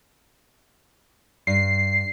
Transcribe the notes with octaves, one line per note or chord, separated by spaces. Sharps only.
G2 C7